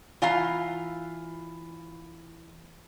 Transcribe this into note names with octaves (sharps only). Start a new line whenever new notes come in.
E3 F4 F5 A#5